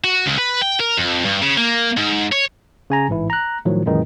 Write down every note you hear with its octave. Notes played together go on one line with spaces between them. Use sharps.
F#4
C#2
B4
G5
A#4
F2
G2
C#3
A#3
G#2
C#5
C#3 G#5 A#5
A1 G#2 E3 E4
A#5 F#6
A2 D#3 F3 F#3
F#2 A#2 D#3 E3 G#3 D#4